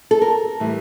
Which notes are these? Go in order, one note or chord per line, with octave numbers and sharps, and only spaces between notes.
A4
A#4
A2 E3 G3